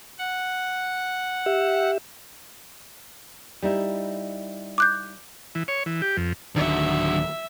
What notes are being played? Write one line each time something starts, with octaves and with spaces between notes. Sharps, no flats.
F#5
G4 E5
G3 D#4 E4
D6 F#6 G6
E3
C#5
E3
G4
F2
D1 D3 D#3 F#3 E5